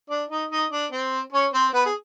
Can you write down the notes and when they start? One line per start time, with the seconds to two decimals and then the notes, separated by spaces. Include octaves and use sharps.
0.10 D4 D5
0.30 D#4 D#5
0.51 D#4 D#5
0.71 D4 D5
0.92 C4 C5
1.33 C#4 C#5
1.53 C4 C5
1.73 B3 B4
1.86 G#4